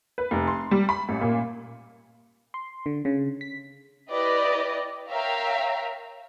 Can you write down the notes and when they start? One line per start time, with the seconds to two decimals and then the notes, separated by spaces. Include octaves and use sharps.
0.18 B4
0.31 F1
0.47 C6
0.71 G3
0.89 B5
1.09 A1
1.21 A#2
2.54 C6
2.86 D3
3.05 C#3
3.41 B6
4.11 E4 G4 B4 D5 D#5
5.10 A#4 C#5 E5 F5 G5 A#5